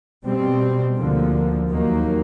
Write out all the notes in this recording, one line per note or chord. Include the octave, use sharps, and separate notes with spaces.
B2 G3 C4
D2 D3 F3 A#3
D#2 D#3 F#3 A#3